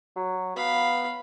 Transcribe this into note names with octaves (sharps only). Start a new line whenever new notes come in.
F#3
B3 F5 B5